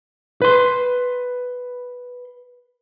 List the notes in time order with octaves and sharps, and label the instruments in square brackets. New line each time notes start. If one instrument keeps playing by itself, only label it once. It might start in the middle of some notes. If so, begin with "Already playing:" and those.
[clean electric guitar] B4 C6